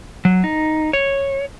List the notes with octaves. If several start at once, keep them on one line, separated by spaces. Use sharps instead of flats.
F#3
D#4
C#5